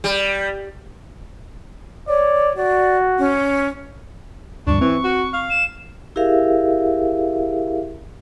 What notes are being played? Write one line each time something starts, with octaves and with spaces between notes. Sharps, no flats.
G3
C#5 D5
F#4 D5
C#4
D2 G2 D4 C#6
E3 C4
F#4
F5
E7
E4 G4 G#4 A#4 E5 F5